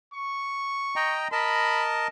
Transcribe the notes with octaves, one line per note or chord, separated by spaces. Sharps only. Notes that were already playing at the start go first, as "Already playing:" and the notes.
C#6
D#5 G5 A#5
A#4 D#5 A5 B5